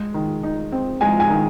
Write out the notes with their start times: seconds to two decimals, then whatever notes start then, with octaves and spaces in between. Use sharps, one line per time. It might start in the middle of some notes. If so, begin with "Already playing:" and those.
Already playing: G#3
0.14 D#3
0.43 D#4
0.72 C4
1.01 G#3 G#5
1.20 G#5
1.30 D#3